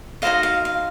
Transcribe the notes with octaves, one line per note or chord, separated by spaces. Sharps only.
D#4 F#4 C5 D#5 F5
F5
F5